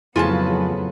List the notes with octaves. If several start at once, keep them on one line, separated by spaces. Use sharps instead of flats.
F2 A2 C#3 F#3 B3 F4 F#4 A5